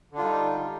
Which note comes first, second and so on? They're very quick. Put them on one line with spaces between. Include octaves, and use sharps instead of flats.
D3 D4 F4 G3 D#4